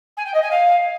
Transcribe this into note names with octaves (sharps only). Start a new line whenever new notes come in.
G#5
G5
D#5
G#5
F5